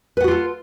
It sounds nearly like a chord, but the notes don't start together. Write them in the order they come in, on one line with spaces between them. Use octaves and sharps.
B4 F#5 F#4 F4 A4